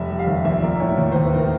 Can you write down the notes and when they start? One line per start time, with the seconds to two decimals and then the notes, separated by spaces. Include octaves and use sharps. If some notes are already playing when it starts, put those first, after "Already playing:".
Already playing: F1 E5
0.10 G3
0.19 F5
0.28 D#2
0.45 A#1 E5
0.63 A#3 D5
0.80 A2 C#5
0.98 D#2
1.12 D#2 C5
1.25 B4
1.33 D#3 A#4